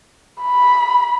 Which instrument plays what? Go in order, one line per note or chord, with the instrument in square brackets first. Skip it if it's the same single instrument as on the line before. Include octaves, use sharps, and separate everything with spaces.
[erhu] B5